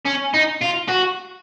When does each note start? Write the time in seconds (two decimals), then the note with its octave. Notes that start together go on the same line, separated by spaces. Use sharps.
0.06 C#4
0.34 D#4
0.62 F4
0.88 F#4